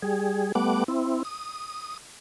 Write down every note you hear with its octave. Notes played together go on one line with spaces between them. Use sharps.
G3 G#4
G3 A3 B3 F#5 D6
C4 E4
D#6